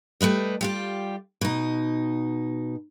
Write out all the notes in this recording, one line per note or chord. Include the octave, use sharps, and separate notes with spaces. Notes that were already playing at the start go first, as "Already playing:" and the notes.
G3 A3 B4 D#5
G3 F4 G4
B2 D#4